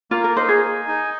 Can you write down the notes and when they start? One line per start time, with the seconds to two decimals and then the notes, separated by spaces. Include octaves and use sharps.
0.11 A#3 F4
0.24 A#4
0.36 D#4 C5
0.49 G#4
0.62 G#5
0.88 D#4